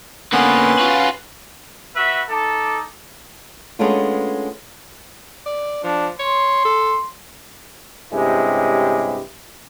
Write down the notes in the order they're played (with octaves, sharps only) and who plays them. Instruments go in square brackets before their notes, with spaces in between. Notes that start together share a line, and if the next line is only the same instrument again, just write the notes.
[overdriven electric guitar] D3 A#3 [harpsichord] B3 [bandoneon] C#4 B4 C6
[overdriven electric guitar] F4 F#4
[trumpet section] F#4 B4 E5
D#4 A4 A5 D6
[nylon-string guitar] G#3 A3 B3 C#4 D4 F4
[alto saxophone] D5
[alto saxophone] F3 [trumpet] D4
[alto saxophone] C#5 [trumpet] C6
[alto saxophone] A4
[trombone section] G2 C3 G#3 C#4 E4 G4